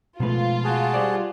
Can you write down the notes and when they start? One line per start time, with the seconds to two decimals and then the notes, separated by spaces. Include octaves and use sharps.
0.20 G#2 B2 F3 G#3 A3 F4 B4
0.64 F#4 G#4 A5
0.94 G3 C5 D5